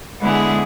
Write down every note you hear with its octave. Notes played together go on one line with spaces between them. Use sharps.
D3 G#3 B3 E4 G#4